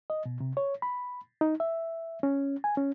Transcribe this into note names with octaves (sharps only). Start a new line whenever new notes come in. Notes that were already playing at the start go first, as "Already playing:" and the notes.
D#5
B2
C3
C#5
B5
D#4
E5
C#4
G#5
C#4